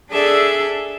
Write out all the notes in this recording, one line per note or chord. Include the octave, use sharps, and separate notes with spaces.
D4 G#4 A4 D5 E5